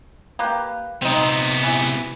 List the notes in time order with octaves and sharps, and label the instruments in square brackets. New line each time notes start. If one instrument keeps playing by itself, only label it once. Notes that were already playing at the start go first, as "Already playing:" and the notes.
[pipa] A#3 G4 B4
[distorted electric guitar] C3 B3 [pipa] C4 D#4
[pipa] E3